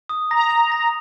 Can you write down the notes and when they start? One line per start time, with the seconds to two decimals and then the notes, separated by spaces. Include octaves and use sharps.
0.09 D#6
0.31 A#5 A#6
0.50 F7
0.72 A#6